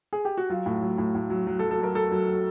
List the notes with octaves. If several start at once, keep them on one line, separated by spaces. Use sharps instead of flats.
G#4
G4
F#4
F#3 F4
A2
F#3
A2
A2
F#3
F#3
A4
F#3
A4
F#3 A#4
F#3 A4
F#3
F#3